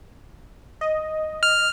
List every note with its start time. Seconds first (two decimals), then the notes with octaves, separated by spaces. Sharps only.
0.81 D#5
1.43 F6